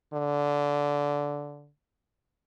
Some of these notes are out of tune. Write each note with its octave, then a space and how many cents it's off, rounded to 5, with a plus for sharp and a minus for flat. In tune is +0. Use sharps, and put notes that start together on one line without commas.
D3 -15